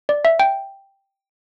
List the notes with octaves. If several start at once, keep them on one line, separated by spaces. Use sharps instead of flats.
D5
E5
G5